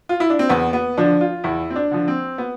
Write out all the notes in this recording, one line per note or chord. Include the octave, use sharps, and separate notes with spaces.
F4
E4
D4
C4
E2 B3
B3
D3 F3 D4
F4
E2 E4
C4
D4
D3 F3
C4
B3